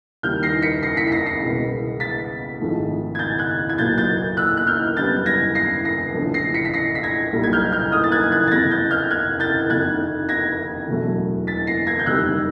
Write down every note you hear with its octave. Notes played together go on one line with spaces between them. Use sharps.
D#2 D#3 G3 A#3 F6 G6
A#6 C7
B6 C#7
A#6 C7
B6 C#7
B6
A#6 C7
A#6 C7
C2 B2 G#3 B3
A6 B6
G#1 G#2 F3 A3
G#6
G6 A6
F#6 G#6
G#6
B1 A#2 F#3 A#3 G6 A6
G6 A6
E6 F#6
F#6
F6 G6
F#2 D3 G3 B3 G6 A6
G#6 A#6
A#6 C7
A#6 C7
A#1 A2 F3
A#6 C7
B6 C#7
B6
A#6 C7
B6
G#6 A#6
B1 A#2 G3 A#3
G#6
F6 G6
F6 G6
D#6 F6
A6
F#6 G#6
F#6 G#6
A6
F2 C3 E3 G#6 A#6
G6 A6
F6 G6
F#6 G#6
G6 A6
F1 F2 C3 D#3 F#6 G#6
G#6 A#6
E1 E2 B2 F#3 A3
A6 B6
A#6 C7
G#6 A#6
G6
F#1 F2 C3 D#3 G3 E6 F#6